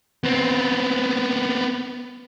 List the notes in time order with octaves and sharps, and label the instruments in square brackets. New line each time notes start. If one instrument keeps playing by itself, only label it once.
[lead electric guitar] B3 C4